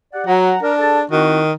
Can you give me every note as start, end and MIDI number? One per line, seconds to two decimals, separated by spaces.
0.13 0.24 67
0.13 0.24 74
0.13 0.24 78
0.27 0.54 54
0.27 0.61 78
0.27 0.61 82
0.63 1.04 62
0.63 0.73 70
0.78 1.00 68
0.78 1.00 69
0.78 1.00 81
1.11 1.52 51
1.11 1.40 60
1.11 1.40 64
1.11 1.40 66